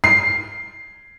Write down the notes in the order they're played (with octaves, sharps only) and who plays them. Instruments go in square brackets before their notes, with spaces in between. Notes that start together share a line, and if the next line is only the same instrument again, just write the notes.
[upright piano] C7